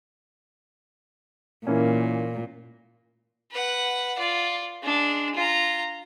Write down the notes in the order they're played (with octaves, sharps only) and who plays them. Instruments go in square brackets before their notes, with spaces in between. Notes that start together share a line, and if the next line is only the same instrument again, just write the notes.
[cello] A#2 [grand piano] E3 A#3 C#4
[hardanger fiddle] B4 F#5
F4 D5
G#3 D4
F4 A#5